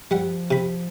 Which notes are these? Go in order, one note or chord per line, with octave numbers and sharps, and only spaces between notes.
F3 G3 F#5
C3 B5